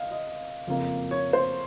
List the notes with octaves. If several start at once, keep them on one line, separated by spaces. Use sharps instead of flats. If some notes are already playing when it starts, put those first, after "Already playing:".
Already playing: D#5 F5
D#5
F#1 F2 C#3 F3 A#3
C#5
C5